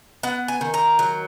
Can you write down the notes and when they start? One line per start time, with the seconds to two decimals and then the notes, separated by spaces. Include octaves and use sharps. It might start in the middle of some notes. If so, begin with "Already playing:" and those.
0.23 B3 F#5
0.48 G#5
0.61 D#3
0.74 A#5
0.99 F#3